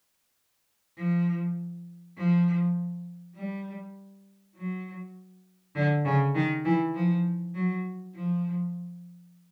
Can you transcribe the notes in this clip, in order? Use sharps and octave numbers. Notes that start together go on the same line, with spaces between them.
F3
F3
G3
F#3
D3
C#3
D#3
E3
F3
F#3
F3